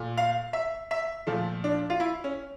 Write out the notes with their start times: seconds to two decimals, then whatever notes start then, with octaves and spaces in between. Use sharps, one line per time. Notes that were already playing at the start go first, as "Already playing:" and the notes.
Already playing: A#2 A3
0.17 F5
0.53 E5
0.91 E5
1.27 A#2 F3 A3
1.64 D4
1.90 F4
2.00 E4
2.24 C#4